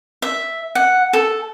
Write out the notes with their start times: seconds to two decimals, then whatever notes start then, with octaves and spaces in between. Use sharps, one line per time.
0.22 E5
0.75 F#5
1.13 A4